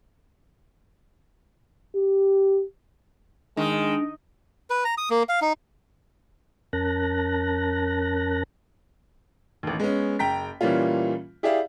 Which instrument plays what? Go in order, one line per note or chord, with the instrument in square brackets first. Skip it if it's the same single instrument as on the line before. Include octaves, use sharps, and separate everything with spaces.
[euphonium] G4
[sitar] D#3 [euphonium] G#3 [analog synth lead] D4
[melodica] B4
A#5
D#6
A#3
F5
D#4
[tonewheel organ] F2 C#4 A#4 A5 F#6 A#6
[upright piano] A1 D#2
G#3 B3 C#4
F#1 G5 A#5 B6
A#2 E3 G3 A#3 C#4 F4
E4 G4 G#4 D5 E5 F5